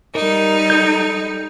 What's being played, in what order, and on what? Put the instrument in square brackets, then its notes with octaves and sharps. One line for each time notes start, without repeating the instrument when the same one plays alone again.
[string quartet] G3 D#4 [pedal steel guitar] A#4
[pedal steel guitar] A4 G6